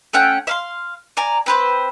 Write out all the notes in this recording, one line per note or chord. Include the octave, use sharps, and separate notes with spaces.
A3 C#4 F#5 G5
E5 F5 C6
D5 G#5 A#5
C4 B4 C5